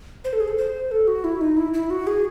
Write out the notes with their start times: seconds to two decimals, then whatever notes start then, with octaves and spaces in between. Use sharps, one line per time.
0.24 C5
0.33 A4
0.40 G#4
0.48 A4
0.58 C5
0.91 A4
1.07 F#4
1.24 E4
1.41 D#4
1.57 E4
1.74 E4
1.90 F#4
2.07 G#4